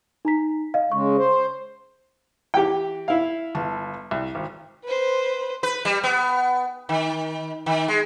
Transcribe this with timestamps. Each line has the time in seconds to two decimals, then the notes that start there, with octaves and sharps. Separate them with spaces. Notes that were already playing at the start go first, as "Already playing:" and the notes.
0.25 D#4 A#5 B6
0.74 D#5 F5
0.92 C#3 G#3 C#6
1.18 C5
2.54 E3 G4 G5
3.08 E4 F5
3.55 G1 A5
4.11 C2
4.35 G#1
4.84 B4 C5
5.63 B4
5.85 G3
6.04 B3
6.89 D#3
7.66 D#3
7.88 G#3